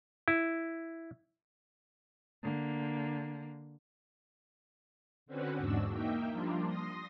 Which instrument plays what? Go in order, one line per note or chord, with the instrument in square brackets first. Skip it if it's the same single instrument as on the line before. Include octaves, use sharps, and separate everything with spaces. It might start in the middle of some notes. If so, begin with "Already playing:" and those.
[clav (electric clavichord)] E4
[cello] D3 A#3
[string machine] D3 C4 C#4 F#4 B4
E2 G#2 D4 F#4 E6
A#3 D#4 E5 G5
F3 G3 A#3 D4 F4
C6 D#6 A#6